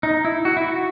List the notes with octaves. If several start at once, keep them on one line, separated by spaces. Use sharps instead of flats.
D#4
E4
F#4
E4
F#4